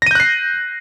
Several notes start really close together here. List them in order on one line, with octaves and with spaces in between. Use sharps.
A#6 D#7 G6 F#6 C7